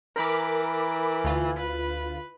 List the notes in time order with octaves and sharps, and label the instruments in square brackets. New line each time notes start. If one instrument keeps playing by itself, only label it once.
[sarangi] E3 [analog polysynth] A#4 B5 D6
[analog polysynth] D2 F4
[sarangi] B4